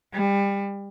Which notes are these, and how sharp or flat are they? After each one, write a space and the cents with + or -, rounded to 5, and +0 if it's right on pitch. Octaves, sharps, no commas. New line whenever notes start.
G3 +25